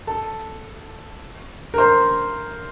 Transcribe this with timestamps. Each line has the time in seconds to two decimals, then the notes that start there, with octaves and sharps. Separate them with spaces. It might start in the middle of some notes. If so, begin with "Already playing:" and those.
0.07 A4
1.74 A#4
1.78 C5